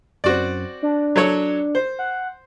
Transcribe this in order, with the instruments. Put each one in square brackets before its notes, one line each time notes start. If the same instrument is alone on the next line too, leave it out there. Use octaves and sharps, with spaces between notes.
[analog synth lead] F#2 [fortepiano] C4 F#4 D5
[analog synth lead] D4
[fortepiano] F#3 A4 C#5
C5
[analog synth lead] F#5